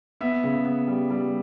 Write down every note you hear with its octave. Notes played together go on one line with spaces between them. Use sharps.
B3 E5
C#3
B3
G3
G3